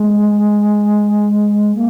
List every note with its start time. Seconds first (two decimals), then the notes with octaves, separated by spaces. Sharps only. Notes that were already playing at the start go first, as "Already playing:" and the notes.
Already playing: G#3
1.75 A#3